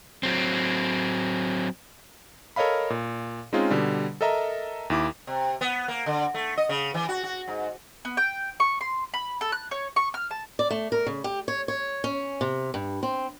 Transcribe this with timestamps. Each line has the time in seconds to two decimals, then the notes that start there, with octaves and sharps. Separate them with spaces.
0.23 F#3 C4
2.56 A4 A#4 C#5 D#5 F5 B5
2.90 A#2
3.53 G#3 C4 C#4 D#4 F4 G#4
3.70 B2 D3 G3
4.21 A4 A#4 D#5 E5 A#5 E6
4.90 D#2 E4 D6
5.27 C3
5.61 B3
5.88 A#3
6.06 D3
6.34 A3
6.57 D#5
6.69 C#3
6.94 E3
7.09 F#4
7.24 F#4
7.48 G#2
8.05 B3
8.17 G5
8.60 C#6
8.81 C6
9.14 B5
9.41 A4
9.52 F#6
9.71 C#5
9.96 C#6
10.14 F6
10.31 A5
10.59 D5
10.71 A3
10.92 A#4
11.06 C#3
11.24 G4
11.48 C#5
11.68 C#5
12.04 C#4
12.41 C3
12.74 G2
13.03 C4